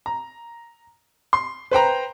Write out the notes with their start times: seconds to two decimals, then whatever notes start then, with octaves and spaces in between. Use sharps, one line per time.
0.06 A#5
1.33 C6
1.71 B4 C5 G5 A#5